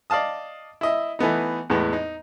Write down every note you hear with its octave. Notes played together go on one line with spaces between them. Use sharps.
D5 D#5 F5 A5 D#6
E4 D#5 E5
E3 A3 B3 D#4
E2 A2 G#3 B3
D#4